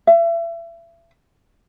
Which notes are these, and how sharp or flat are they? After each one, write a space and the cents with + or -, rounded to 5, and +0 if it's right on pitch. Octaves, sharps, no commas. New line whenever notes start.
E5 +35